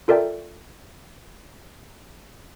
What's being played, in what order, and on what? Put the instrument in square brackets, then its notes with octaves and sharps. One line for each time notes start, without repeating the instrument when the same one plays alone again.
[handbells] F4 A4 A#4 D5 E5 G5